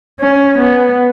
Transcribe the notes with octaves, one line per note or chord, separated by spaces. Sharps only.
C#4
B3